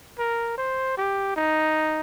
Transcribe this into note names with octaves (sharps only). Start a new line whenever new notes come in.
A#4
C5
G4
D#4